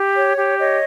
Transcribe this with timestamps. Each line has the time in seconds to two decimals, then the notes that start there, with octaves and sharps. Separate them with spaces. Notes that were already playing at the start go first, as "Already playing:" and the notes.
Already playing: G4
0.15 C#5
0.37 G4
0.58 C#5 D#5